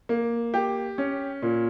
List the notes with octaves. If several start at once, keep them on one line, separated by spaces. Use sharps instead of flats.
A#3
G4
C#4
A#2